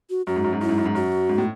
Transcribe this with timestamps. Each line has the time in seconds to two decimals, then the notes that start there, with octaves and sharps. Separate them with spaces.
0.10 F#4
0.27 F#2 F#4
0.36 G#2
0.44 F#2
0.53 G#2
0.61 F#2 E4
0.69 G#2
0.78 F#2
0.86 G#2
0.95 F#2 F#4
1.29 G#2
1.38 A2